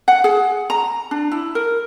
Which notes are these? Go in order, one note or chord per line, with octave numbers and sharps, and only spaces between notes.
F#5
G#4
A#5
D4
E4
A#4